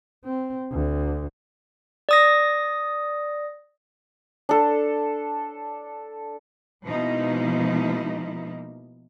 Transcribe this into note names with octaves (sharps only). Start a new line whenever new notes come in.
C4
D2
D5 D#6 A#6
D4 A4
B2 F3 G#3 A#3 D#4 E4